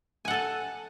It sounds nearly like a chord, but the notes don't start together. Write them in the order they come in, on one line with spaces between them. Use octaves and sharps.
G#5 F#5 A4 A5